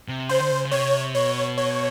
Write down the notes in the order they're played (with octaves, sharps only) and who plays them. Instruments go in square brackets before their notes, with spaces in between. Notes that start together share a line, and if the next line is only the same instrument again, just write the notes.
[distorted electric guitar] C3
[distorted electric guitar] C#3 [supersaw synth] C5
[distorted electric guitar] D3
C#3
C#3
[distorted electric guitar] C3 [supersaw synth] C#5
[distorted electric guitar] B2 [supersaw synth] C#5
[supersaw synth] C#5